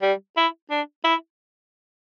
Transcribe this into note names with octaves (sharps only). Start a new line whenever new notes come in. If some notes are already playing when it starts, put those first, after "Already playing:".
G3
E4
D4
E4